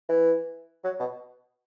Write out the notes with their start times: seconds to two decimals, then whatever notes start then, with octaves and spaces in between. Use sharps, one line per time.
0.09 E3
0.84 F#3
1.00 B2